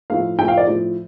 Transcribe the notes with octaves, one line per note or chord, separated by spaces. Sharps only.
A2 F3 A3 F5
A2 F3 A3 G5
F5
D5
A2 F3 A3